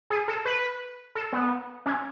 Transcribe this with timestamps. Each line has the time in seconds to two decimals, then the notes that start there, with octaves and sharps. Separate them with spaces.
0.10 G#4
0.28 A4
0.45 B4
1.15 A4
1.33 B3
1.86 C#4